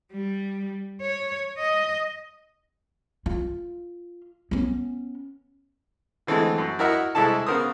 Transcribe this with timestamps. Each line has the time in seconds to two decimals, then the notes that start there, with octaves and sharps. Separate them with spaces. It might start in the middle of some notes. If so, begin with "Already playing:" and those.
0.12 G3
1.01 C#5
1.58 D#5
3.26 F4
4.51 B3 C#4
6.27 D3 E3 G#3 A3 C4
6.58 F#2
6.79 E4 F#4 A#4 D#5 E5 F#5
7.15 C2 G#3 E4 A4 A5
7.47 C#3 B3 A#4 C5 D#6